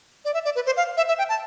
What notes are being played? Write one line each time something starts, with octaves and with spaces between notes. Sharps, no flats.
D5
E5
D5
B4
C5
F5
E5
E5
G5
A5